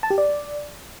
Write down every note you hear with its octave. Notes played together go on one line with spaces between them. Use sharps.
A5
G4
D5